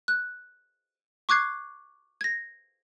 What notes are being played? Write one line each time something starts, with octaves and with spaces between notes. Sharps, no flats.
F#6
C#6 D6 F#6 G#6 C7
G#6 A#6